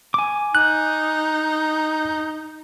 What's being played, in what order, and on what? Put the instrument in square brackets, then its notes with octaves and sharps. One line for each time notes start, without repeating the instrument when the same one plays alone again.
[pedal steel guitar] G#5 D6
[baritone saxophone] D#4 [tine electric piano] F#6